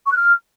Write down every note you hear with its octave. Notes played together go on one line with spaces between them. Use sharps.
C#6
F#6
F6